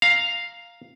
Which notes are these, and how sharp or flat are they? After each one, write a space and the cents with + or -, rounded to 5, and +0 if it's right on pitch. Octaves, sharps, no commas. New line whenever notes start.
F5 +0 A#5 +0